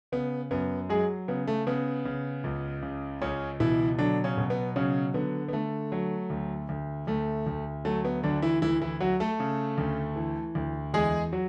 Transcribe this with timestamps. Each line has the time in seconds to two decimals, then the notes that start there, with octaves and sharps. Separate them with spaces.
0.12 C#3 B3
0.51 F#2 B3
0.89 F#3 G#3 G#4
1.28 C#3 B3
1.47 A3
1.67 C#3 B3
2.05 C#3
2.44 C#2
2.82 C#3
3.22 C#2 C#3 C#4
3.60 B2 E3 E4
3.98 D3 F#3 D4
4.24 C#3 C#4
4.38 B2
4.50 B3
4.76 C#3 F#3 C#4
5.14 D3 B3
5.49 B3
5.53 D3 A3
5.92 F#3
6.30 D2
6.69 D2
7.07 D2 A3
7.47 D2
7.85 F#3 A3
8.05 B3
8.23 D2 D3 D4
8.42 E3 E4
8.62 D2 E3 E4
8.82 E3 E4
9.00 F#3 F#4
9.20 A3 A4
9.40 C#3
9.78 D2
10.16 E3
10.55 D2
10.93 E2 G#3 G#4
11.32 F#3 F#4